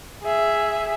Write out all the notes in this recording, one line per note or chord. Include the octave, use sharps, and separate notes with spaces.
G#4 E5